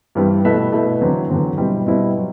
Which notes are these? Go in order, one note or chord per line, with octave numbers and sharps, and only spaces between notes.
G2 E3 G3 C4
B2 A3 E4 B4 E5
B2 A3 E4 B4 E5
E2 D3 F#3 C4
E2 D3 F#3 C4
B2 G3 C4 E4
B2 G3 C4 E4
F#3